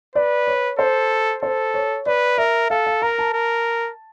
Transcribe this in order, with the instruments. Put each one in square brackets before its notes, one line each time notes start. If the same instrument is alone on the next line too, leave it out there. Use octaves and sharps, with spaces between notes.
[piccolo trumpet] B4 [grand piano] D5
[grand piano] C#5
[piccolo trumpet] A4 [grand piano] C5
[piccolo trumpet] A4 [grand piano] C5
[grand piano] C#5
[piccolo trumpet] B4 [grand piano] D5
[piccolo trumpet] A#4 [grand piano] E5
[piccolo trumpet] A4 [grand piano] F5
[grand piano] F5
[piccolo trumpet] A#4 [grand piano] A#5
[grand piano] A5
[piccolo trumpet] A#4